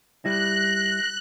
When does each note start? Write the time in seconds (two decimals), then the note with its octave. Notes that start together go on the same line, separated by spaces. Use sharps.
0.25 G3 E4 F#6 A#6